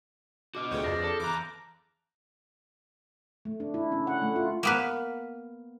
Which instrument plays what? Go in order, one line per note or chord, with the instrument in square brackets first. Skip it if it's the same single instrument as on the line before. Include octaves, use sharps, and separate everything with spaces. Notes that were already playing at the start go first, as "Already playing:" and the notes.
[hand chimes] D4 [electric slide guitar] F#4 D#5 [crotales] D6 F6
[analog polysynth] D2 C#5 G5 [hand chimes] F4 G#4 B4 [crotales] G6
[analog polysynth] F2 D4 [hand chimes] G#4 D#6 C7 [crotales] A6 A#6
[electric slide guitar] A4 [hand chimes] A5
[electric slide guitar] E2 A#5 [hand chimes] B5 E6 F#6 [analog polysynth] D6
[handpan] A3
D4
E4
C#4
F#5
A3
F4
[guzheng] A#3 B3 B4